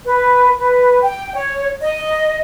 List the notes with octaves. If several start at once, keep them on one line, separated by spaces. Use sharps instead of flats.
B4
B4
G5
C#5
D#5